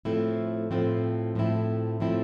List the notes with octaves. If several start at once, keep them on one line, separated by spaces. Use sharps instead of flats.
A2 F3 A3 C4 E4
A2 F3 A3 C4 E4
A2 F3 A3 C4 E4
A2 F3 A3 C4 E4